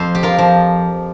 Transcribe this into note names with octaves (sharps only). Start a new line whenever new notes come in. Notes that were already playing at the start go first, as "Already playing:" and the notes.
Already playing: F2 C5
G4
F4 A#4
F3